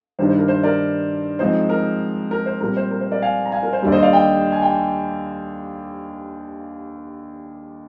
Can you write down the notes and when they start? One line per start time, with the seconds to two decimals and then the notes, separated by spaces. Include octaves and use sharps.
0.19 G2 D#3 G3 D4 C5
0.29 C5
0.38 A#4
0.48 C5
0.63 A#4 D5
1.39 G#2 F3 C4 D#4 C5
1.69 A#4
2.31 A#4
2.46 C5
2.60 A#2 G3 C4 A#4
2.77 C5
2.91 A#4
3.01 C5
3.11 A#4 D5
3.22 F5 G#5
3.45 A#5
3.52 F5 G#5
3.63 A#4
3.73 C5
3.82 D#2 D3 G3 D5
3.92 C5 D#5
4.03 D5 F5
4.13 D#5 G5
4.52 G#5
4.62 G5